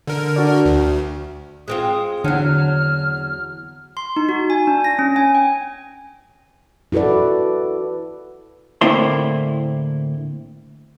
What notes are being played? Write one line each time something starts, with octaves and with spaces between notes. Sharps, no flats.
D3 A#4
D4 F#4 D5
D2
G#3 C4 F4 D#6
E2 D3 F#3 F6
C6
D#4
F#4
G#5
D4
A#6
C#4
G#5
G5
E4 F#4 A4 B4 D5
A2 D3 A#3 C4 E4 C6